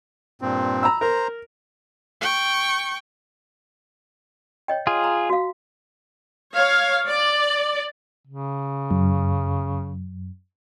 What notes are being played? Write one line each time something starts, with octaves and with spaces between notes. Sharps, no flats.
G2 A#2 C4
A#5 B5 E6
A#4 C5 A#5
G5 C#6
C#5 D#5 G5
F4 G#4
A#5
F#4 F5
C#5 F5
D5
C#3
F#2